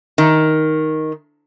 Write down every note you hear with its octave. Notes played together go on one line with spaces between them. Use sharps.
D#3